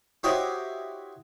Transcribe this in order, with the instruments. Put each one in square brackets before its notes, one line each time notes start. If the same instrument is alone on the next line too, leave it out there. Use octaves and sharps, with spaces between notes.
[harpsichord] E4 F#4 G4 C5 C#5 D#5